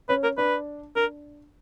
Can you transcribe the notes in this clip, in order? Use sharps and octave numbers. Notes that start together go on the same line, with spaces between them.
C#4 B4
A#4
D4 B4
D4 A#4